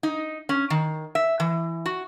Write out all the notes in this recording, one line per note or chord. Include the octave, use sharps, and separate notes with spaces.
D#4
C#4
D#3
E5
E3
F#4